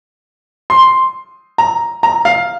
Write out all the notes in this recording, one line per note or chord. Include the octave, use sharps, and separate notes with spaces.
C6
A#5
A#5
F5